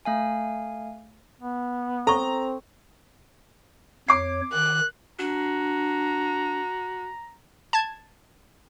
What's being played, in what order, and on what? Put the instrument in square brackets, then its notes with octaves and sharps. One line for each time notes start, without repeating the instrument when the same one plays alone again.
[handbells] A3 F5 G#5
[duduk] B3
[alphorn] C4 [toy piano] A4 C#6 [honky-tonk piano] A#5
[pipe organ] F2 C#5 [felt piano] D6 C7
[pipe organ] D#3 [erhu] F#6
[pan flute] D4 [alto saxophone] F#4 [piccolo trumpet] A#5
[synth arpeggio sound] A5 G#6